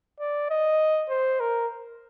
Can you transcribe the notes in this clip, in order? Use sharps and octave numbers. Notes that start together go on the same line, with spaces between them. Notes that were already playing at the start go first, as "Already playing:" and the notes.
D5
D#5
C5
A#4